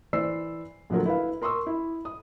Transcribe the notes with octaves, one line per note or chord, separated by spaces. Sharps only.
E3 C5 D5 E6 C7
A#1 D3 F3 F#3 A3 A#4
E4 B4 F5
A#4 C6 C#6 D#6 E6
E4
D#6